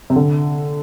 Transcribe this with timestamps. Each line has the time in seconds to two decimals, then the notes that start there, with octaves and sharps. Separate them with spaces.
0.10 C3
0.16 D3